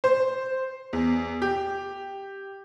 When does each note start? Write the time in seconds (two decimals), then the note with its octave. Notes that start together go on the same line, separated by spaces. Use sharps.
0.04 C5
0.93 E2
1.42 G4